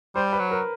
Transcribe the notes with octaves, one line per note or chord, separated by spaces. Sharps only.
G3 C5
B4
F#3
A#4